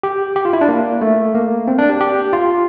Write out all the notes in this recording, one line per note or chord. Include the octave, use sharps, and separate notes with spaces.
G4
G4
F4
E4
D4
A#3
A3
A#3
C4
D4
G4
G4
F4